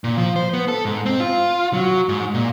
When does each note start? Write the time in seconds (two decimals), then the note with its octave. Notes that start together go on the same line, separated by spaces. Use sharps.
0.04 A#2
0.17 F3
0.36 C5
0.53 B3
0.68 A4
0.85 G#2
1.06 C4
1.20 F4
1.73 F#3
2.09 G#2
2.34 A#2